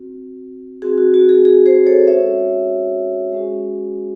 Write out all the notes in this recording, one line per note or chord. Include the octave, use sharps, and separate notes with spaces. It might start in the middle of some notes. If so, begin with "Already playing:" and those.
Already playing: C4 F#4
C4 F#4 G#4
F#4
F#4
G#4
G#4
G#4 C5
A4 C#5
G#3 C#4 F#4 C#5 E5
G#3 C#4 F#4 G#4